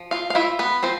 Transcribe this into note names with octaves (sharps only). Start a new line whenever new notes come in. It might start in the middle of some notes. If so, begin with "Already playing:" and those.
Already playing: F3
F4 F5
F5
E4 F4 E5
B3 B4
F3 C4 C5